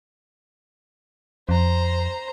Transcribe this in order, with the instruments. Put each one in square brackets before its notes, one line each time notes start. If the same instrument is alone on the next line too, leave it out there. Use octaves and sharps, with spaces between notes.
[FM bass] F2 [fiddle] C5 A#5